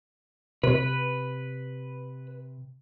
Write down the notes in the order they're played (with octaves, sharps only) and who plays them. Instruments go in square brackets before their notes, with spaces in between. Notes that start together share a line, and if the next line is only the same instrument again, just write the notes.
[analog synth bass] C3 [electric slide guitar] B4